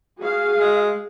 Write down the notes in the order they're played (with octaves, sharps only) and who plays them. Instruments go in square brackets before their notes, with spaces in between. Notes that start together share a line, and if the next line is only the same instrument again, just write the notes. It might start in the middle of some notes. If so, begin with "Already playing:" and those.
[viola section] F#4 G#4 F5
[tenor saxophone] G#3